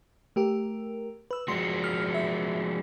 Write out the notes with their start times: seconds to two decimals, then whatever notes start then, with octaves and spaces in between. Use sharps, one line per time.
0.36 A3 G4 A#4
1.31 B4 E6
1.48 F3 G#3 F#4 C6
1.84 F6
2.14 E5